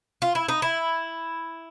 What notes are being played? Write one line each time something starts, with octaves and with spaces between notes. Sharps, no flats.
F4
E4
D#4
E4